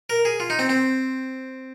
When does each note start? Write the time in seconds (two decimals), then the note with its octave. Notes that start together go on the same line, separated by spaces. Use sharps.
0.10 A#4
0.25 G#4
0.40 F4
0.50 D#4
0.59 C4
0.69 C4